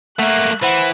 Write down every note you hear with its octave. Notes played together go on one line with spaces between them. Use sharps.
A3 A#3 E5 F#5 F#6
E3 C5 F#5 B5